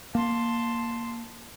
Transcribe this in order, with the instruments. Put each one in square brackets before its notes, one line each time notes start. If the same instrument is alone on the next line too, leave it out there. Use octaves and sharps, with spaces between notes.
[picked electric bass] A#3 [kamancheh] A5 C6